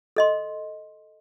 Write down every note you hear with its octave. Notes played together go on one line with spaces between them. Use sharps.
A4 D#5 C6